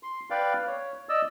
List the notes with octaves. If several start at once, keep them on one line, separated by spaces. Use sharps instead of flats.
C6
B4 D5 F5 G5
C#5
D5 D#5 E6